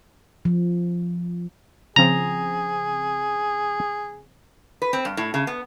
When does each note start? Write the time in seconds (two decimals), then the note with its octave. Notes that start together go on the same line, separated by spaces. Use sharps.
0.45 F3
1.96 C#3 F3 C4 G#4 A#5
4.82 B4
4.93 C4
5.05 G2
5.17 A2
5.34 C#3
5.47 B3